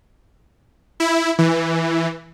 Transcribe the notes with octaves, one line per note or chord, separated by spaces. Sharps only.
E4
E3